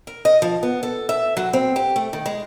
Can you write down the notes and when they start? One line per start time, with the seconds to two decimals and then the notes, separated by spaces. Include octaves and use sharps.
0.07 A#4
0.25 D#5
0.42 F3
0.63 B3
0.83 A4
1.09 E5
1.37 F#3
1.53 C4
1.76 G4
1.96 A3
2.13 D#3
2.26 G#3